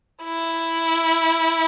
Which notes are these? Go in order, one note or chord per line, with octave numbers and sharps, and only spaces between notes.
E4